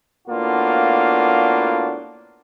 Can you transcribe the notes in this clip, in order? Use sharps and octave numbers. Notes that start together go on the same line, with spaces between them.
A2 A#3 B3 D4 F4 F#4